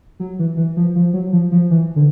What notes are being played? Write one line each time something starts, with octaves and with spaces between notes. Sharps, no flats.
F#3
E3
E3
F3
F3
F#3
F3
F3
E3
D3